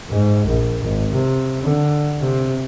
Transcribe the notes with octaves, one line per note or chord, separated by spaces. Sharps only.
G#2
A#1
G#1
C3
D3
C3